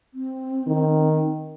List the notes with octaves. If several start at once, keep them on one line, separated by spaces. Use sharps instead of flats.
C4
D#3